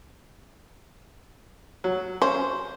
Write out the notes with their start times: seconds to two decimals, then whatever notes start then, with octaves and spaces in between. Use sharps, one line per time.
1.84 F#3
2.22 C#4 C5